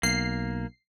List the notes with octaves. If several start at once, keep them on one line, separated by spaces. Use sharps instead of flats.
B1 A#3 C7